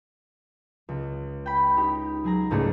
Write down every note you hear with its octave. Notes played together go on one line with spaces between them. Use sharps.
C#2
G5 B5
D#4 G4
F#3 G#4 A#5
C#2 G#2 A3 C#4 D4 G#4